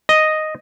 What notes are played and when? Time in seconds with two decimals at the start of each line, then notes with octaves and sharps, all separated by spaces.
0.09 D#5